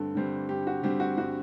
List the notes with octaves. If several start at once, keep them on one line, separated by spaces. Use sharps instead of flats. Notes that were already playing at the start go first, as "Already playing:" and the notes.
Already playing: G2 D3 G3 C4 A4
D3 G3 C4
G2 G4
F#4
D3 G3 C4 G4
F#4
G2 F#4